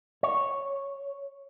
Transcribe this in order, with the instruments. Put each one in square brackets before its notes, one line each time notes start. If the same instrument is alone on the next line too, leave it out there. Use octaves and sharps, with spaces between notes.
[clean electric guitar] C#5